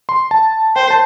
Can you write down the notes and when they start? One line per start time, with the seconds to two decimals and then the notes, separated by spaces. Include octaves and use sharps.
0.09 C6
0.31 A5
0.76 C5 G5
0.90 A5